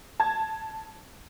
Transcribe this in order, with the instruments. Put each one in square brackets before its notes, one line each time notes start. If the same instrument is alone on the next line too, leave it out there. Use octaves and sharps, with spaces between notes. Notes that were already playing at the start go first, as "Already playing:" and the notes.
[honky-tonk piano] A5 G#6